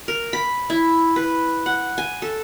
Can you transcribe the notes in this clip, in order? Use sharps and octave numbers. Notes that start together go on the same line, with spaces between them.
A#4
B5
E4
B4
F#5
G#5
A4